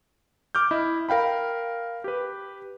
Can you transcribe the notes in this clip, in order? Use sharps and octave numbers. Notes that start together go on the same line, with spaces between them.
D6 F6 G6
E4 D#5
A#4 F5 G5 B5
G4 B4